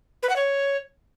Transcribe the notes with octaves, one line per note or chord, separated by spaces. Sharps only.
B4
F#5
C#5